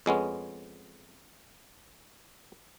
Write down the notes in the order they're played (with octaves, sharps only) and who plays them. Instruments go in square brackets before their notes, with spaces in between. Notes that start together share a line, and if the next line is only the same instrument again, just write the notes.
[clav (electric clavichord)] F2 G#3 B3 C#4